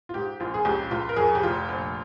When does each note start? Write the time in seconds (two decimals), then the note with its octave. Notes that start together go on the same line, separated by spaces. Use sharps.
0.09 F4
0.14 G#2 G4
0.40 A#1 F4
0.54 G#4
0.65 C#2 G4
0.91 C#2 F4
1.09 A#4
1.16 F2 G#4
1.35 G4
1.43 F1 F4
1.69 A#1